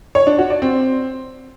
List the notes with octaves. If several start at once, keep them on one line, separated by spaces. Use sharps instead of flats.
C#5
D4
F#4
D5
C4